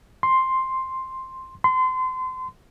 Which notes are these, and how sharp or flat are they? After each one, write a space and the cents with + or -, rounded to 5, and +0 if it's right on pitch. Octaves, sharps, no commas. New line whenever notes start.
C6 +5
C6 -30